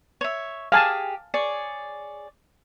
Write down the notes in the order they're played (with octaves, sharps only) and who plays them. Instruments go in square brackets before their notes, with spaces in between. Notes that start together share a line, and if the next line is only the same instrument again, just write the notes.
[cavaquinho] C#5 E5
[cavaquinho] G4 G#4 D6 [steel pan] F5 G#5 A5
[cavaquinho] G#4 C#5 D5